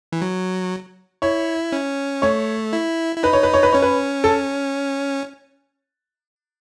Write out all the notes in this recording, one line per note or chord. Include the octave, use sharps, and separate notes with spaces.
E3
F#3
E4 C#5
C#4
A3 C#5
E4
E4
D#4 B4
C#5
B4
C#5
B4
C#4 C#5
B4
A4